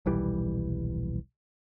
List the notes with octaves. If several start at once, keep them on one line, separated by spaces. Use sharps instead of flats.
D#1 B1 E3 G3